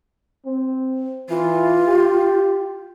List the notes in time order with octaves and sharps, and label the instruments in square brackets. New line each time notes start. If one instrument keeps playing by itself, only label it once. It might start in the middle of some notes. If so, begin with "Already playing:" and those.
[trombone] C4
[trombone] E3 [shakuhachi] F4
[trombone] G4